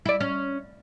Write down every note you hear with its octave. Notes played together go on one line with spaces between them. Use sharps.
E4 D5
C#4